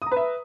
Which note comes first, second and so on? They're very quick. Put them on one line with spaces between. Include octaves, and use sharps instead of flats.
D#6 A#5 B4 E5